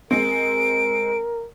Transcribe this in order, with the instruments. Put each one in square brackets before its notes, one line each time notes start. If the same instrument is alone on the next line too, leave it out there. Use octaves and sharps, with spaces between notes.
[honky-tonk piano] G#3 C4 [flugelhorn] A#4 [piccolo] D7